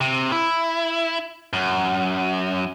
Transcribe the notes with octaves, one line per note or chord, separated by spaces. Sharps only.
C3
E4
F#2